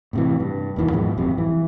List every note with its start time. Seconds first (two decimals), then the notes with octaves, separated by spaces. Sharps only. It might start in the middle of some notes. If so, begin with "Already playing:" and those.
0.13 A2 C3 E3
0.40 G2
0.76 E1 D#2 D#3 E3
0.92 G#2 B2 F3 G#3
1.17 D1 C2 F2 C3
1.38 E3